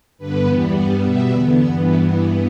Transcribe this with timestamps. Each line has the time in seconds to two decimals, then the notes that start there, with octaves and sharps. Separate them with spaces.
0.18 G2 D3 B3 B4
0.46 E2 E3 G3 B3
0.74 G2 G3 B3 D5
1.02 B2 G3 B3 E5
1.30 E2 D3 B3
1.58 G2 E3 B3 E6